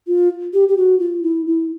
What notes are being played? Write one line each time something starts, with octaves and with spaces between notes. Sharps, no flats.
F4
G4
G4
F#4
F4
E4
E4